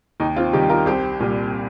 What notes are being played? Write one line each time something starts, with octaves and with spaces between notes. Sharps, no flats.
D#2 D#4
C4 F4
D#3 G3 D#4 G4
F4 A#4
C2 G4 C5
A#2 G3